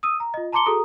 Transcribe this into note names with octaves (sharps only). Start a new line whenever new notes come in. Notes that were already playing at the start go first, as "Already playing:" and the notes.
D#6 E6 D#7
A#5
F4 D#5
A5 A#5 C6 D6 C#7 G7
F#4 G#4 A4 A#5 D#6